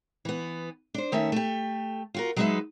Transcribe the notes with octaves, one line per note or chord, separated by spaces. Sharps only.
E3 B3
D4 C5
D#3 A3 C#4 E5
A3 G4
F4 F#4 A#4
F#3 G#3 B3 D#4 B4 E5